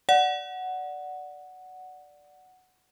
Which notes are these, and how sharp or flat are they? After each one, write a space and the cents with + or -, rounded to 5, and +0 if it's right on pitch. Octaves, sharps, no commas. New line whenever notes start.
D5 -5 F#5 +0